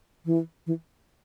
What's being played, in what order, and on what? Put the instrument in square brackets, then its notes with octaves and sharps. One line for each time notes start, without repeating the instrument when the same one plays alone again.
[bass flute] E3
E3